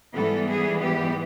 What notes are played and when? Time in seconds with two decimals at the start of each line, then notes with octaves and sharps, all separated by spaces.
0.13 G#2 E3 G3 B3 A4
0.48 G#4
0.83 G4